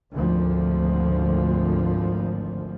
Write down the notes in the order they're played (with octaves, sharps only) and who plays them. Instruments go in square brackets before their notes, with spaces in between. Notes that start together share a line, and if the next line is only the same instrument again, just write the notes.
[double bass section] G#1 D2 D3 F3